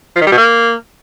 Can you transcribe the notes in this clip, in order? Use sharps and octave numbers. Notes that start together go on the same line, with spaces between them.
F3
D#3
G3
B2
A#3